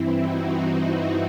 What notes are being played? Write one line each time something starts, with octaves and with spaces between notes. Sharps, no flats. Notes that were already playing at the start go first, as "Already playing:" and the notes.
Already playing: G2 E3 C4 E4
D#4 F#4